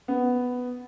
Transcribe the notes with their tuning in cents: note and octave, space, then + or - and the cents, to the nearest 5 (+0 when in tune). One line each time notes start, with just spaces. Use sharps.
B3 +5